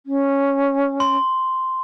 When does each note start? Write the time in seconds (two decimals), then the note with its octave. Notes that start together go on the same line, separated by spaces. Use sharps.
0.06 C#4
1.00 C6